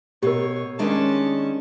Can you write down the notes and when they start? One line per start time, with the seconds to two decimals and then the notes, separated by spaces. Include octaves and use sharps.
0.23 B2 G4 A#4 C#5
0.79 D#3 G#3 C#4 D4 A5